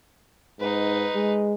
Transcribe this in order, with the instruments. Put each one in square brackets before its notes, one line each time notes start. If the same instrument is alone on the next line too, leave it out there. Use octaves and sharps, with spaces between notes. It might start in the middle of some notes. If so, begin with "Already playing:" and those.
[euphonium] G#2 [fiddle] D#4 B4
[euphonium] G#3